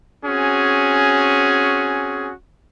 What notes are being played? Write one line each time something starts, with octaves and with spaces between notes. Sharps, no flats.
C4 C#4 F#4 G#4